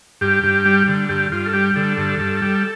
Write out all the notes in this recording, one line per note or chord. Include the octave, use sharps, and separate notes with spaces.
G2 G4
G2
G3
D3
G2 G4
G2 F4
A4
G3 G4
D3 A4
G2
G2
G3